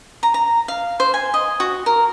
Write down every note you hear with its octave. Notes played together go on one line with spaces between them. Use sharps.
A#5
A#5
F5
C5
G#5
D#5
F#4
A#4